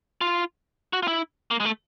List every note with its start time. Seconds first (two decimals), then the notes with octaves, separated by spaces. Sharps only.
0.21 F4
0.93 F#4
1.03 F4
1.08 E4
1.51 A#3
1.60 G#3
1.65 A3